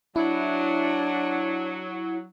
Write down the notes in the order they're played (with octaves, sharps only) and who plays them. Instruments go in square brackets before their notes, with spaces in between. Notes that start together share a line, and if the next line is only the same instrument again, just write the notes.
[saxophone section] F#3 [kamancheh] D4 [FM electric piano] E4